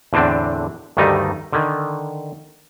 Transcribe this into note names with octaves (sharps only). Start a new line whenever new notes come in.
E2 A2 D3 C4 D4
D2 G2 D#3 G3 A3 D#4
D3 D#3